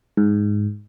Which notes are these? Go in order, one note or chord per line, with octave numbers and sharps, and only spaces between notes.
G#2